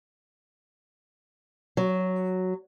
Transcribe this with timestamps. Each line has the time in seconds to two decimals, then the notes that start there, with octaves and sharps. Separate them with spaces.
1.77 F#3